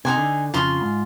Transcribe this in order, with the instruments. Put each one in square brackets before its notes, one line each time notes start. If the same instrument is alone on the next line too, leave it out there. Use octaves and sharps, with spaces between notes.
[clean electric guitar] C3 [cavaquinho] D#4 F#4 G#5
[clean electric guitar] D3
[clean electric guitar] F2 C#3 F3 [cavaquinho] F4 C6
[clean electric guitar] G#2